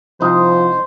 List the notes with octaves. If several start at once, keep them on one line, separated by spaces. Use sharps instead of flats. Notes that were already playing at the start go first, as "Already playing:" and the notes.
C2 F3 D#4 C5